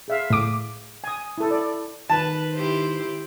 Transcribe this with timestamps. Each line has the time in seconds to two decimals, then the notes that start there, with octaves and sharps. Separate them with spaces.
0.08 G#4 E5 F5
0.30 A2 D6
1.04 G#5 D#6
1.38 E4 A4
1.51 D5
2.10 D#3 B4 A5
2.53 E4 G4 C5